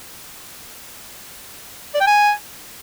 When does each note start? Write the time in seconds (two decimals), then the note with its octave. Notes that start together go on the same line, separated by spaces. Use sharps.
1.95 D5
2.01 G5
2.07 G#5